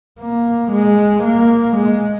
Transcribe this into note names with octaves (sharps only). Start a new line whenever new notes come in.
A#3
G#3
A#3
G#3